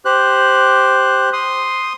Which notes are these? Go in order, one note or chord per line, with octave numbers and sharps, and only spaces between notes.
G4 C5 F#6
C6 D#6